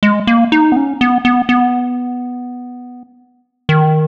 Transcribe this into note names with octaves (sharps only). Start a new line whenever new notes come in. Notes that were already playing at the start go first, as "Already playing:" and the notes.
G#3
A#3
D#4
B3
C#4
B3
B3
B3
D#3